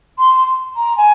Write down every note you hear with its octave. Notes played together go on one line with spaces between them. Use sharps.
C6
A#5
G#5